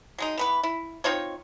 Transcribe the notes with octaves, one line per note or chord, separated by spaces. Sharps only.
F#3 G#3 D#4
E3 B3 B4
E4
C4 D#4 F4 C#5